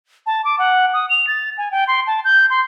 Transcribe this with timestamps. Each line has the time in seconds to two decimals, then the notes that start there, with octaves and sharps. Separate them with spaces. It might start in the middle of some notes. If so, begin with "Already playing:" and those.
0.26 A5
0.45 D6
0.59 F#5
0.93 D#6
1.10 F7
1.27 A6
1.58 G#5
1.71 G5
1.87 C6
2.07 A5
2.24 G6
2.50 C6